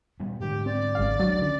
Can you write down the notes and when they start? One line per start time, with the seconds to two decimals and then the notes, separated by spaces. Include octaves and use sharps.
0.20 A#2 G3 B3
0.40 G#2 D3 G4
0.66 C4 D5
0.95 G#1 C#3 F5
1.19 C#2 F#3 D4
1.42 D3 C#4 D5